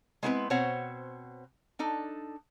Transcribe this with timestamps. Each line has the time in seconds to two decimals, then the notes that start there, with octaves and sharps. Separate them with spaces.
0.23 G#3 B3 C4 E4 A#4 B4
0.50 B2 C4 C5 C#5 F#5
1.79 D4 D#4 A4